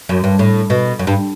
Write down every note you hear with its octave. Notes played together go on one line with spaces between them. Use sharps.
F#2
G2
A2
B2
F#2
G2